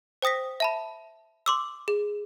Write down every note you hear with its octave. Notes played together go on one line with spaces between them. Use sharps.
C5 G5 D#6 A#6 B6
E5 A5 B5
C6 D6 E6
G#4